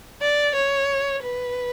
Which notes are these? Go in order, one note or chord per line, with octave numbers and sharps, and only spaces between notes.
D5
C#5
B4